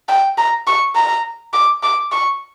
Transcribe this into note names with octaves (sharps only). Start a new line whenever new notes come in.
G5
A#5
C#6
A#5
D6
D6
C#6